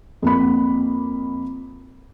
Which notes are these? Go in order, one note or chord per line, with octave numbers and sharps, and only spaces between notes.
F2 A#3 B5